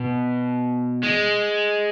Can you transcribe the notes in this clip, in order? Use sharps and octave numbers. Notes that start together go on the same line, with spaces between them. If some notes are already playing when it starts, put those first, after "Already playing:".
Already playing: B2
G#3